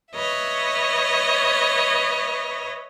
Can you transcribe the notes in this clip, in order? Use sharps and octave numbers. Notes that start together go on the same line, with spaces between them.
B4 C#5 D#5 E5